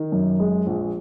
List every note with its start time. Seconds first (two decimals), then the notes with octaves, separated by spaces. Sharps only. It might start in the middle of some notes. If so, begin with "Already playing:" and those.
Already playing: D#3
0.12 F#2
0.40 G#3
0.66 A#1